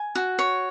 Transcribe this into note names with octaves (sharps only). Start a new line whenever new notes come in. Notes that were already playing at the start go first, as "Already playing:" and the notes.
Already playing: G#5
F#4
C#5